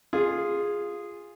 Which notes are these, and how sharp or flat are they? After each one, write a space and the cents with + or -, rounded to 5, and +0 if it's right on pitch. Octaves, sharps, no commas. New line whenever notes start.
F4 +0 G#4 -10